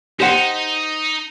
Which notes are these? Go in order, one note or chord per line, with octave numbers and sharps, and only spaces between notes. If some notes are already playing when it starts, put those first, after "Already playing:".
D#4 G4 C5 F#5